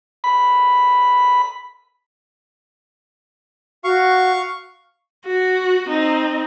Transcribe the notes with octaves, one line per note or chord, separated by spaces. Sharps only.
B5
F#4 F5 C#6
F#4
C4 D#4